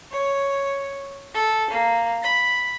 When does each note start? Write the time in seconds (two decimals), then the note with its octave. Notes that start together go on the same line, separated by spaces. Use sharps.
0.12 C#5
1.33 A4
1.72 A#3
2.23 B5